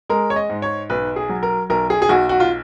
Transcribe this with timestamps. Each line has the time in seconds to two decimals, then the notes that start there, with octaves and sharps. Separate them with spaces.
0.09 G#3 A#4
0.30 C#5
0.36 D#5
0.50 G#2
0.62 C#5
0.90 B1 B4
1.16 G#4
1.29 F#3
1.43 A#4
1.70 B1 A#4
1.90 G#4
2.02 G#4
2.09 B1 F#4
2.29 F#4
2.40 F4